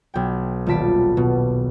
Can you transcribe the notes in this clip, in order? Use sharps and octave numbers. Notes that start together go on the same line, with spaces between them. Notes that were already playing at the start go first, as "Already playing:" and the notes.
B1 G5
D#1 F4 A5 B6 D7
B2